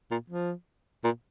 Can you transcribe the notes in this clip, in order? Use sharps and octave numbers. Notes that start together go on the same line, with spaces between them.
A#2
F3
A#2